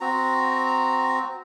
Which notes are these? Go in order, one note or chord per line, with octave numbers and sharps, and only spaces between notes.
C4 F#4 A#5